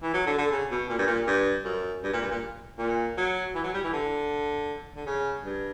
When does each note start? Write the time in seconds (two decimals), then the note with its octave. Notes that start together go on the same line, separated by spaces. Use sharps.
0.03 E3
0.13 F#3
0.26 D3
0.38 D3
0.52 C#3
0.71 B2
0.89 A#2
0.98 G2
1.07 A#2
1.27 G2
1.65 F#2
2.03 G2
2.13 A#2
2.22 G2
2.31 A#2
2.78 A#2
3.17 F#3
3.55 E3
3.64 F#3
3.74 G3
3.84 E3
3.93 D3
4.96 D3
5.06 C#3
5.45 G2